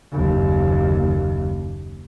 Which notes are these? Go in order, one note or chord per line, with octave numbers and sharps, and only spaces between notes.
F#1 D#2